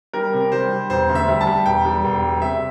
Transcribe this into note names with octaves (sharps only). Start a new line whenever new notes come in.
G3 A#4
C3
G3 C5
G3
E1 C5
D2
E5
G3
A5
G3
E1 G5
G3
E1
G3
C3 E5